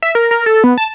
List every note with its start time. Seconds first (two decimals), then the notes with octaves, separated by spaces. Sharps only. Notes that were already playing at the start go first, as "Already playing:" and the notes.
0.02 E5
0.15 A#4
0.31 A#4
0.46 A4
0.64 B3
0.78 A5